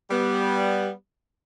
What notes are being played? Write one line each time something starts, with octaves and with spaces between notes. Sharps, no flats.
G3 B3